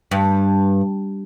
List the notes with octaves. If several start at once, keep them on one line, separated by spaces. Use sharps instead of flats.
G2